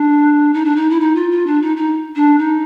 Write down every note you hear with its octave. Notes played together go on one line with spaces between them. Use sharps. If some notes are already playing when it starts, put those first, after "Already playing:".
Already playing: D4
D#4
D4
D#4
E4
D#4
F4
F4
D4
D#4
D#4
D4
D#4